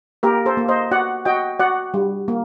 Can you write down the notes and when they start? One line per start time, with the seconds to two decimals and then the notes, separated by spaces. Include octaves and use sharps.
0.23 A#3 G4 A#4
0.46 A4 C5
0.57 A#3
0.68 C5 D#5
0.91 F#4 D5 F#5
1.25 F#4 D#5 G5
1.59 F#4 D5 F#5
1.94 G3
2.28 A#3